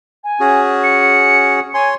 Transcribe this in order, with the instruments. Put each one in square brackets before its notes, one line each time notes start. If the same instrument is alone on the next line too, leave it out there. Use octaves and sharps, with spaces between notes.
[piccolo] G#5
[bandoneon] C#4 F#4 G#4
[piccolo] C#7
[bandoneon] C#5 C6 [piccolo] G#5